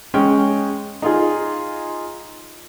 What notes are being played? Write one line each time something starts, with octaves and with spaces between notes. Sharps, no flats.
G#3 C#4 G5
D#4 F4 G#4